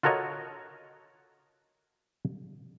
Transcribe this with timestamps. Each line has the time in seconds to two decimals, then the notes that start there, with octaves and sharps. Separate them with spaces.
0.03 F4 F#4 A4 A#4 C#5 D#5